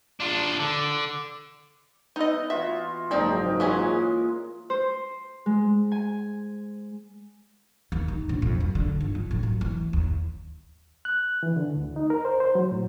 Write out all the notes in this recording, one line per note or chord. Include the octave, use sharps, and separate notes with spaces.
D4 F4
D3
B3 D#4 D#5 E5
E3 F4 F#4 E5
F#1 G#2 F3 C4 G4 A#4 D5 D#5
A#2 E3 G#3 C#4 G#4
C5
G#3
G#5
D#2
D#3
A#1
F2
F#2
D3
G1
F3
A2
F#2
E3
D#2
F#6
E3
D3
D2
D#4
A#4
C5
C5
F#3
A2